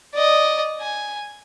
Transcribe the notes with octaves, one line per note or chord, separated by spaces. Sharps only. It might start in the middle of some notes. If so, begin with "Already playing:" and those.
D5 D#5
G#5